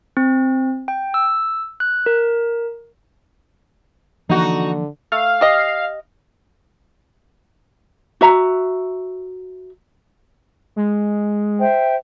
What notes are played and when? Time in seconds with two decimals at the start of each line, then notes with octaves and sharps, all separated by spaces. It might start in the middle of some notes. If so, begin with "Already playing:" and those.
0.17 C4
0.88 G5
1.14 E6
1.80 F#6
2.06 A#4
4.30 D3 E3 F3 A#3 D#4 F#4
5.12 A3 F5
5.41 G4 D#5
8.21 F#4 E5 A#5
10.76 G#3
11.60 C5 E5 G5